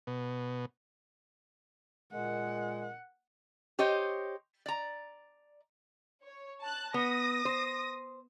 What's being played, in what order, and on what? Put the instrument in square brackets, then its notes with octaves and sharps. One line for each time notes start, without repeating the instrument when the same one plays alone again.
[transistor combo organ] B2
[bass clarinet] A#2 [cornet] G#3 [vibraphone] A#4 D#5 [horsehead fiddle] F#5
[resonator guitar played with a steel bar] G4 C5 C#5 D#5
D5 A#5
[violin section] C#5
A5 F#6
[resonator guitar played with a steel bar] B3 [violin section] D#6 A#6
[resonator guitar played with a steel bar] C5